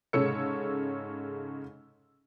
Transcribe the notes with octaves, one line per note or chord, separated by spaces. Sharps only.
G#2 C#3 A4 C#5 E6 C#7